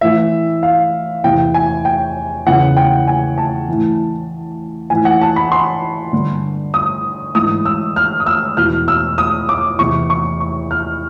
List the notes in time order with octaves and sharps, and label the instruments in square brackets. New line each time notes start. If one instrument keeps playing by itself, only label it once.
[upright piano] A2 E3 E5
F5
E2 C3 E3 G5
G#5
G5
E2 C#3 E3 F#5
G5
G#5
A5
A2 E3
A2 E3 G#5
F#5
A5
B5
C6
G2 D3
D#6
G#2 E3 D#6
E6
F6
D#6
E6
E2 B2 F6
E6
D#6
D6
E2 C3 E3 C#6
C#6
C#6
F6